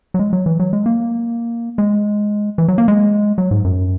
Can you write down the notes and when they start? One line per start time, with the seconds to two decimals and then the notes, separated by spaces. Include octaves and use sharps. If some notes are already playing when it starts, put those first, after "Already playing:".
0.14 F#3
0.19 G#3
0.33 F#3
0.46 E3
0.60 F#3
0.73 G#3
0.86 A#3
1.78 G#3
2.58 E3
2.68 F#3
2.78 A#3
2.88 G#3
3.38 F#3
3.51 G#2
3.64 F#2